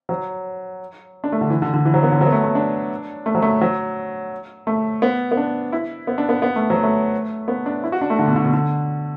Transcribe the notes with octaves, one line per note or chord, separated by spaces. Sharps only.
F#3
D4
A3
D3
E3
D3
D3
E3
F#3
B3
D3
F#3
B3
A3
A3
D4
A3
F#3
A3
F#3
A3
B3
B3
D4
E4
B3
D4
B3
B3
A3
F#3
A3
B3
D4
E4
F#4
D4
A3
D3
B2
D3
B2
D3